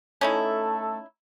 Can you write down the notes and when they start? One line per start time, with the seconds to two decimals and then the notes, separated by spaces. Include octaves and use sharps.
0.21 A3 C#4 D#4 E4 A4